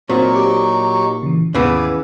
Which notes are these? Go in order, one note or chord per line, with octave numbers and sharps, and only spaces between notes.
A#2 F#3 C4 D#4 F#4 C5 C#6
G4 D6
C#3 E3
D#2 G#2 C#3 E3 B3 B4 D5